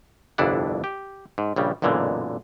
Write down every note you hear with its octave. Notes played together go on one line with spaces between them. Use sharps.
G1 C2 F2 D4 E4 F#5
G4
G#2
A#1 C#3 G3
B1 F#2 A#2 D3 E3 G#3